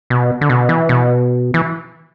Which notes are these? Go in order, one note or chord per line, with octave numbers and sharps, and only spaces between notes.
B2
D3
B2
E3
B2
E3